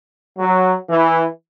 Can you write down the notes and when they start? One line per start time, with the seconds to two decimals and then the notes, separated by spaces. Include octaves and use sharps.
0.38 F#3
0.89 E3